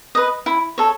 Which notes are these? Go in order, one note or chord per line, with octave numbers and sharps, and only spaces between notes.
B4 D#5
E4
A4 C#5